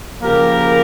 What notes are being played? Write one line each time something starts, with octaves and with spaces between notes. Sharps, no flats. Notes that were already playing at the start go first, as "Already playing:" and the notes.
C#3 F3 A#3 G4 A#4